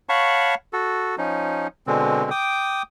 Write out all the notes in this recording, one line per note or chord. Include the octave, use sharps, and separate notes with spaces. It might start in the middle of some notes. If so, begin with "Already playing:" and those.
C#5 F5 F#5 A5 B5 C#6
F#4 A4
F3 C#4 D#4
B2 D3 G#3 C4
G5 D6 D#6